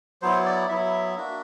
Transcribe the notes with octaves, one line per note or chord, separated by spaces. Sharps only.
F#3 B3 E4 C5
D5
F#3 B3 E4 E5
A#3 D4 F#4